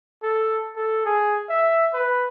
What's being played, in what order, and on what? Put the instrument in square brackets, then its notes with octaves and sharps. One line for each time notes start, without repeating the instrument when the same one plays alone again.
[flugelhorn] A4
A4
G#4
E5
B4